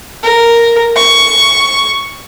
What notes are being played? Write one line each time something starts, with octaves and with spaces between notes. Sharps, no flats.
A#4
C#6